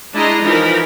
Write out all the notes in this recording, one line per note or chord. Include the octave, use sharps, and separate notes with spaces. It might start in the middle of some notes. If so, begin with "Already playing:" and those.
G#3 D4 E4 D#5 A#5 C6
E3 F3 D#4 A#4 B5